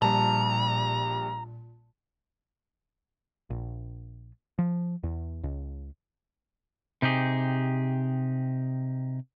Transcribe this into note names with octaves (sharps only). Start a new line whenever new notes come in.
A#1 A#2 G3 A5 A#5
A#1
F3
E2
C#2
C3 D#4 G4 G#4